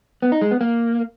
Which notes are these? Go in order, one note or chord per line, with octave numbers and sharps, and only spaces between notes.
B3
D#4
G#3
B3
A#3